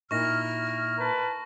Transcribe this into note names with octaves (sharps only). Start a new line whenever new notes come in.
A#2 D#4 E4 C#6 F6 A#6
A#4 B4 A5